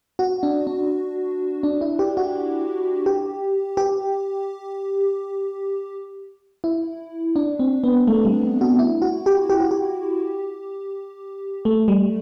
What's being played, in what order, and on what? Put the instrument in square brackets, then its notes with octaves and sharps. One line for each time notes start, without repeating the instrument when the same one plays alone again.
[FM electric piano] F#4
D4
D4
D4
E4
G4
F#4
G4
G4
E4
D4
C4
B3
A3
G3
F#4
E4
F#4
G4
G4
F#4
G4
A3
G3